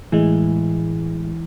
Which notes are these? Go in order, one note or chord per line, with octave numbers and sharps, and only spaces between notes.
A2 E3 G#3